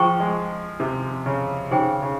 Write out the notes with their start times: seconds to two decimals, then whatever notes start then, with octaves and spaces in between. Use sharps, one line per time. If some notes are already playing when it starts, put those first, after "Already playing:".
Already playing: F3 G#4 C5 G5 A#5 C#6
0.20 G#3
0.80 C3
1.26 C#3
1.71 C#3 D#4 G#4 C5 G5
2.02 C#3